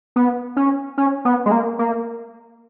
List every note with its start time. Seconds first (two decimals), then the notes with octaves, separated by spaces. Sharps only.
0.16 B3
0.57 C#4
0.98 C#4
1.25 B3
1.46 G#3
1.52 A#3
1.79 A#3